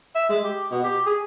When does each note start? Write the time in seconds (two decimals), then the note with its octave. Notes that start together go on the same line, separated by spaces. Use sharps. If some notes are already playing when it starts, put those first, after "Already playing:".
0.15 E5
0.29 G#3
0.43 G4
0.71 B2
0.84 G4
1.06 G#4